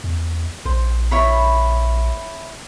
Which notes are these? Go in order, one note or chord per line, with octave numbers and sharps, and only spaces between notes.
E2
A#1 C5
E4 C#5 B5